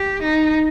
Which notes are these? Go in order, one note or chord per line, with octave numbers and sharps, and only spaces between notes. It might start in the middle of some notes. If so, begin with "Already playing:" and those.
Already playing: G4
D#4